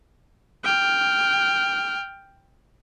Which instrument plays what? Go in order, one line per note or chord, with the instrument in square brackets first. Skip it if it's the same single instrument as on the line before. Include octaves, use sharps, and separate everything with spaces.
[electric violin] G5 F6